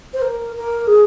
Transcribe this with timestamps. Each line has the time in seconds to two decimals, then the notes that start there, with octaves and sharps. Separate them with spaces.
0.14 C5
0.22 A#4
0.55 A#4
0.87 G#4